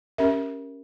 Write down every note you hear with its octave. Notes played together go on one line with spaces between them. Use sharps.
C#4 G4 A#4 E5